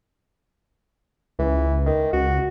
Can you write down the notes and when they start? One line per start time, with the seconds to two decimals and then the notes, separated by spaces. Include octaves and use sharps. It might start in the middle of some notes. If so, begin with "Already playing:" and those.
1.39 C#2 E3
1.86 D#3
2.13 C#2 F#4